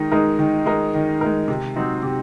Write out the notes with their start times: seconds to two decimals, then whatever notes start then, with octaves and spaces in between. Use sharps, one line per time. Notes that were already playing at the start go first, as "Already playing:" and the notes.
Already playing: D#3 G#3 D#4 A#4
0.12 G#3 D#4 A#4
0.39 D#3
0.66 G#3 D#4 A#4
0.94 D#3
1.21 G#3 D#4 A#4
1.48 C3
1.76 F#3 C4 D#4
2.03 C3